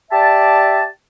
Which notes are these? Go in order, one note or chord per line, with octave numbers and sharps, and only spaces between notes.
G4 D5 E5 A5